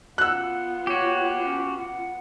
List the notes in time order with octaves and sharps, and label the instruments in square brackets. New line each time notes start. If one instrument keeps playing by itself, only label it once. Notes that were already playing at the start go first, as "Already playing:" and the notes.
[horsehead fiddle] B3 F4 [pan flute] F#5 [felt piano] E6 F#6
[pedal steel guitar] F#4 G4 [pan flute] C#5
[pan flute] C#4
F#5